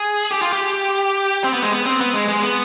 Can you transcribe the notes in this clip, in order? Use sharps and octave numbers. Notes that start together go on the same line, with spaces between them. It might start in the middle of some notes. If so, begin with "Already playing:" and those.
Already playing: G#4
G4
F4
G4
C4
B3
G#3
B3
C4
B3
G#3
G#3
B3